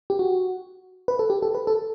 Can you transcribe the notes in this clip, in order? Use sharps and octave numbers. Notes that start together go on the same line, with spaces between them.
G4
F#4
B4
A4
G4
A4
B4
A4